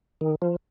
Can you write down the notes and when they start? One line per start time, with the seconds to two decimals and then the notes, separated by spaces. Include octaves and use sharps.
0.21 D#3
0.42 F3